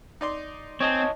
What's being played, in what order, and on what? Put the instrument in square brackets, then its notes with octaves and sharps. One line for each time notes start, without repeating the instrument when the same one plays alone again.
[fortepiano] D#4 D5 C6
[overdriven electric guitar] C4 [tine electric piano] C#5 D#5 A5 [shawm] G#5